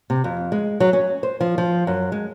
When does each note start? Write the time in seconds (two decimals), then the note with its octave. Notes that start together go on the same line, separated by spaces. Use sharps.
0.10 C3
0.24 F2
0.52 G#3
0.80 F#3
0.93 C#4
1.23 C5
1.40 F3
1.58 F3
1.87 F#2
2.12 G#3